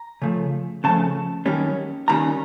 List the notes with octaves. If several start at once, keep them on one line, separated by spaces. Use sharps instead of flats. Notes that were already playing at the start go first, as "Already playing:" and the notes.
Already playing: A#5
C#3 F3 A3
C#3 F3 A3 A5
F#2 D#3 G3 A#3 C#4
F#2 D#3 G3 A#3 C#4 A#5